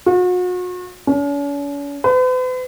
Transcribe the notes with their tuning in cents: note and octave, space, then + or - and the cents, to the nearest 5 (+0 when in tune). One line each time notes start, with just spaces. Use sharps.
F#4 -40
C#4 +45
B4 +45